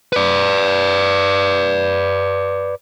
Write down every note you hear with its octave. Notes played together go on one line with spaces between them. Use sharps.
B4 D5